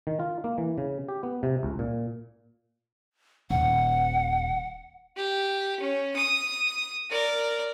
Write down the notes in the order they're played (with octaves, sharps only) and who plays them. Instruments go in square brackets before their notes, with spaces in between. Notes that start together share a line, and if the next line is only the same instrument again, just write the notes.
[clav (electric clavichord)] D#3
F4
A#3
E3
C#3
G4
B3
C3
C#2
A#2
[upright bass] D#1 [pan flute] F#5
[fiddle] G4
C#4
D#6
A#4 D5